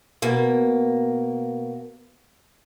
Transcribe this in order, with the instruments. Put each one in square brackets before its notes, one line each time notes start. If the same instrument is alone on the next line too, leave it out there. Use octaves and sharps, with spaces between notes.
[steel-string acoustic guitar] B2 A#3